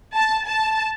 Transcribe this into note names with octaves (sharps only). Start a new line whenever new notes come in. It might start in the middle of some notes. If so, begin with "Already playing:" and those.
A5
A5